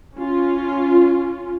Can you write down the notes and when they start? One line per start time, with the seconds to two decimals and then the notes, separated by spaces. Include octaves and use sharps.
0.17 C#4 F4